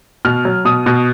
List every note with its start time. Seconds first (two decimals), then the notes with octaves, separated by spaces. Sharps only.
0.25 B2 F6
0.45 F#3
0.65 B2 D#6
0.86 B2